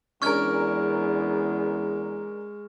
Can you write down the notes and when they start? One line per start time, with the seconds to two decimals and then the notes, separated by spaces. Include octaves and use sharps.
0.22 E2 G#3 C#4 D4 A#4 C#6 F6 G#6